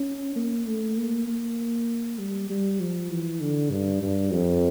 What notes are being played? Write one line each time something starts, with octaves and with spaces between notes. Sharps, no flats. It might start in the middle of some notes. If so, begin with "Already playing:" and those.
Already playing: C#4
A#3
A3
A#3
A#3
G3
G3
F3
E3
D3
G2
G2
F2